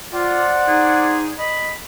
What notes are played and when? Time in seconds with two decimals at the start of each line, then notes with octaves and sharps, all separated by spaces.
0.13 F4 C5 D5 F#5
0.67 D#4 G#4
1.38 D#5 B5